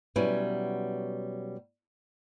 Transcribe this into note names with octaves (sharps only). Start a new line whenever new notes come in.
B2 F#3 G3 C#4 E4 B4